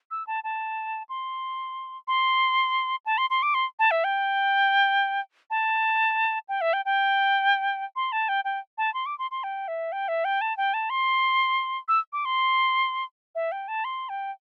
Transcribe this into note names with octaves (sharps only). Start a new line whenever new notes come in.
E6
A5
A5
C6
C6
A5
C6
C6
D6
C6
A5
E5
G5
A5
G5
E5
G5
G5
C6
A5
G5
G5
A5
C6
D6
C6
C6
G5
E5
G5
E5
G5
A5
G5
A5
C6
E6
D6
C6
E5
G5
A5
C6
G5